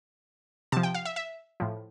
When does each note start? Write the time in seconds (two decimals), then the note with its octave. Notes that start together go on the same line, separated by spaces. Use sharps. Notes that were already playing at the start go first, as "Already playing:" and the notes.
0.72 C3 F3 A5
0.83 G5
0.94 F5
1.05 E5
1.16 E5
1.60 A2 F3